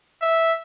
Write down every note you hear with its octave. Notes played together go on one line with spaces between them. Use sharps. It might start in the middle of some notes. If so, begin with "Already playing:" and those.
E5